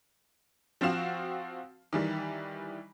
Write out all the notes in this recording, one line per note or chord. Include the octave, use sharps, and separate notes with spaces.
F3 C4 F#4 F5 E7
D#3 E3 G3